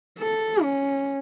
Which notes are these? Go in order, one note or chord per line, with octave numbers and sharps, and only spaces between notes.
A4
C#4